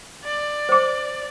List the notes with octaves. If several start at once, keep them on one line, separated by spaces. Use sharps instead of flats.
D5
C5 D6